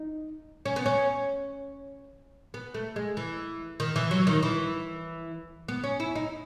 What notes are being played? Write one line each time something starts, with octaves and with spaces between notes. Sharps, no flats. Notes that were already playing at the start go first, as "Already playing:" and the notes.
Already playing: D#4
C#4
B3
C#4
B3
A3
G#3
E3
D#3
E3
F#3
D#3
E3
B3
C#4
E4
D#4